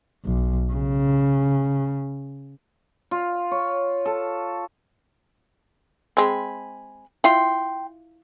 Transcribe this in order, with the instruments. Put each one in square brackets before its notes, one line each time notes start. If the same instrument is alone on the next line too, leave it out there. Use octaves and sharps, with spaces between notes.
[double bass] B1
C#3
[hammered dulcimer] F4
C#5
A4
[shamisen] G#3 C4 [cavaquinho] G#5 B5
[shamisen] E4 F4 [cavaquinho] G5 C6